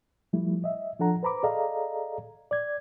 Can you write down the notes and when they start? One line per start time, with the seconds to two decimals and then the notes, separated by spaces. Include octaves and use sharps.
0.33 F3 G3 A3 E4
0.64 D#5 E5
0.99 F3 D4 A4 F#5 A#5
1.23 B4 C5 A#5 B5 D6
1.43 G#4 A4 D5 D#5 F5 A#5
2.51 D5 G#6